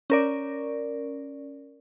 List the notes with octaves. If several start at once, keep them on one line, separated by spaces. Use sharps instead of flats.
C#4 A#4 D5